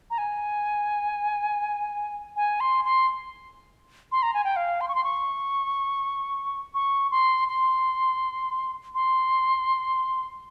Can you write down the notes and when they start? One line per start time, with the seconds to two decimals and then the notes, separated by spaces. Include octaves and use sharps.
0.11 A#5
0.18 G#5
2.36 G#5
2.60 C6
2.85 C6
4.12 C6
4.23 A#5
4.34 G#5
4.44 G5
4.56 F5
4.81 C6
4.88 C#6
4.95 C6
5.04 C#6
6.74 C#6
7.11 C6
7.48 C6
8.95 C6